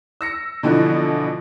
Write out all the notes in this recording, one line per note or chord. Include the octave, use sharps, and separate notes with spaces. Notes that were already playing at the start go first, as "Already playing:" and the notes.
E6 A#6 C#7
B2 D3 E3 F3